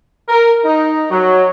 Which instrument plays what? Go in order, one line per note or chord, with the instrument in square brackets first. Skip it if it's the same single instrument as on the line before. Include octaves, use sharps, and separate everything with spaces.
[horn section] A#4
D#4
F#3